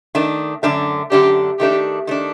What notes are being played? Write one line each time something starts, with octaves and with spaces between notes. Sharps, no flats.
D#3 A3 D4
F#2 D3 A3 D4
F#2 D3 A3 D4 G4
D#3 A3 D4 G4
D#3 A3 D4